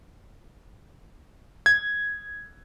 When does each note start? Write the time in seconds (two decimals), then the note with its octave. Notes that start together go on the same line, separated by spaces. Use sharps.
1.66 G#6